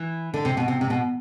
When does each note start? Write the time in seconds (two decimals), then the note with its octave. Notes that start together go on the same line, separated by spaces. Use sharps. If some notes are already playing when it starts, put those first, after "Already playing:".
Already playing: E3
0.34 D3
0.45 C3
0.57 B2
0.68 C3
0.81 C3
0.90 B2